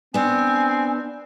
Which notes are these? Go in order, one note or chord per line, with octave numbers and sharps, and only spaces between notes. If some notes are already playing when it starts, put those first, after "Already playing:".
B3 C4 D4 G#5